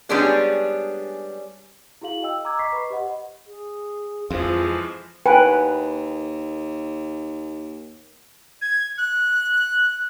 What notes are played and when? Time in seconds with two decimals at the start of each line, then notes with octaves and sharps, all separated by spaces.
0.09 G3 G#3 B3 C#4 D4 G#4
2.02 E4 F#4 G#4 F5 F#7
2.23 D#5 G5 E6
2.45 A#5 D6 E6 G#6
2.59 D#5 A#5 C#6 D6 B6 C7
2.72 B4 B5
2.90 G4 C5 D#5 F#5
3.47 G#4
4.30 F2 E3 F3 G#3 F4 G#4 C5
5.26 D#2 B4 G5 G#5
8.62 G#6
8.98 F#6